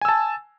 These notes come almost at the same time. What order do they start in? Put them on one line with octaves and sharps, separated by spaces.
G#5 E6 A5